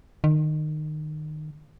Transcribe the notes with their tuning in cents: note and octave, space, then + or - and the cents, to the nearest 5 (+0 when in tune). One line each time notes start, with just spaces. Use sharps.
D#3 -25